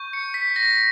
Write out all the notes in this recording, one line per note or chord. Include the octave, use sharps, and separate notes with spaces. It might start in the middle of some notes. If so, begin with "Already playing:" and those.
Already playing: C#6 G6
C#7
B6
A#6